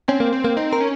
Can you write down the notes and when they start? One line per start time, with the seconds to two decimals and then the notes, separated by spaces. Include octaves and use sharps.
0.08 C4 C#4
0.20 A#3
0.32 C4
0.45 A#3
0.57 C4 D#4
0.73 A#4
0.80 C#4